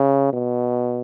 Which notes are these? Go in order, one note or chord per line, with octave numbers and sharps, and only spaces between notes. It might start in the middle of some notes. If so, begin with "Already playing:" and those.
Already playing: C#3
B2